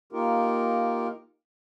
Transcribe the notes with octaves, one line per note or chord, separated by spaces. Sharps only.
A#3 D#4 F4 G4 A#4